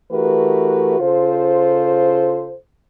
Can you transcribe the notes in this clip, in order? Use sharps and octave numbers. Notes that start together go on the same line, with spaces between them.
E3 A3 F#4 G4 A#4 B4
C#3 F4 A4 C5